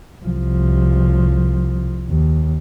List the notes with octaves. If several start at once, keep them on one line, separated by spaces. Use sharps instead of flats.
C2 F3
D#2